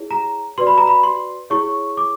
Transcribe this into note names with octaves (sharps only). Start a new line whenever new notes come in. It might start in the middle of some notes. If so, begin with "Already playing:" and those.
Already playing: E4 G#4 C#5
A#5
F#4 B4 D5 C6
B5
A#5
B5
C6
E4 G#4 C#5 C#6
D6